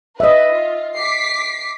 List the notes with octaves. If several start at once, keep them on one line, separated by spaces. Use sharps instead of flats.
B4 D#5 E5
F4
D6 B6 C7